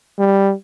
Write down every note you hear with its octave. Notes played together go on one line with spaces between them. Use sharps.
G3